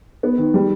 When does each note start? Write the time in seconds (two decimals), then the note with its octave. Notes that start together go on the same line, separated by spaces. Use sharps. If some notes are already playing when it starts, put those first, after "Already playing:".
0.23 B3
0.38 D#3
0.54 G3